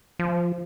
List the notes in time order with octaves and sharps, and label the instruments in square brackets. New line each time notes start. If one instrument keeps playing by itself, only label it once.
[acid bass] F3